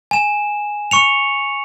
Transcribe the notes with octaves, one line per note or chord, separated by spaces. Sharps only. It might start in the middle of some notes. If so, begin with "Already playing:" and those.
G#5 E7
C#6 C#7 F7